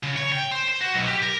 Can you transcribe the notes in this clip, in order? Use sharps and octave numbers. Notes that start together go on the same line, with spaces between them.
C#3
C#5
G5
C5
C5
F#4
B1
G4
A#4